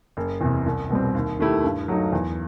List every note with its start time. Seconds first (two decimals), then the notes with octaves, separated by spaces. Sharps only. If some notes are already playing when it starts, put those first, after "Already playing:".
0.17 F#1
0.41 E2 C3
0.66 C2
0.90 B2 G3 C4
1.15 D#2
1.40 D#3 A3 E4 G4
1.64 G2
1.88 F#3 A3 D#4
2.12 E2